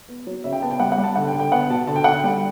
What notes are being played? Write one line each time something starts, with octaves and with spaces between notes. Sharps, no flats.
B3
F#3
C#3 E5
G5
B3 A5
G5
G3 F#5
F#5
G3
A5
D3 F#5
G5
D3
G5
B3 F#5
B2 A5
D3 A5
G5
D3 F#5
G5
G3